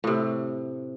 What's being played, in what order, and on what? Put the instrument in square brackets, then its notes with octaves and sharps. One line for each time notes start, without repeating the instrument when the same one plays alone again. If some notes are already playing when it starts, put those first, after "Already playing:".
[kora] A2 C3